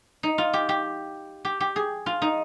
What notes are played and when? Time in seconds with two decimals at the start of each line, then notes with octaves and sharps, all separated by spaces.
0.23 D#4
0.38 F4
0.53 G4
0.69 G4
1.45 G4
1.60 G4
1.76 G#4
2.06 F4
2.22 D#4